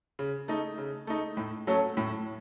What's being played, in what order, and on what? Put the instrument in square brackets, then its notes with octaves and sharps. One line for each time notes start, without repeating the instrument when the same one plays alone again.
[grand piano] C#3
A3 D#4
C#3
A3 D#4
A2
F#3 A3 C#4 A4
A2